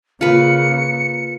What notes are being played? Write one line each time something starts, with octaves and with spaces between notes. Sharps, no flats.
C#3 A#3 F4 B4 C#7